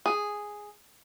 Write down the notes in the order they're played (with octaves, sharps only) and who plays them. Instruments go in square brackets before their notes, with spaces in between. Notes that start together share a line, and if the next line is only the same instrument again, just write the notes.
[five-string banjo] G#4